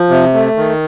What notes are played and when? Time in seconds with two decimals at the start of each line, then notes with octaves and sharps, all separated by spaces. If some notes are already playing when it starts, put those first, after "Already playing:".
Already playing: F3
0.09 C3
0.34 A3
0.57 D#3